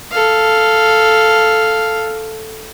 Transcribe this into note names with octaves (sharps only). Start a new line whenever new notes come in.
A4 F5